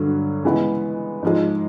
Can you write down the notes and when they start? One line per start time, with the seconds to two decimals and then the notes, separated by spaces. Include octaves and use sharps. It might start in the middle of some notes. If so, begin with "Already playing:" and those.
Already playing: G2 D3 F#3
0.44 C#3 E3 G#3 B3
1.22 G#2 F3 G#3